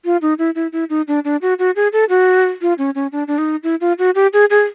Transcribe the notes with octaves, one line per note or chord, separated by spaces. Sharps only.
F4
D#4
E4
E4
E4
D#4
D4
D4
F#4
F#4
G#4
A4
F#4
F4
C#4
C#4
D4
D4
D#4
E4
F4
F#4
G4
G#4
G#4